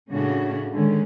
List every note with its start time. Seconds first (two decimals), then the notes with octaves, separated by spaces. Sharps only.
0.11 A2 C#3 C#4 D4 F#4
0.72 D3 D#3 G#3 C#4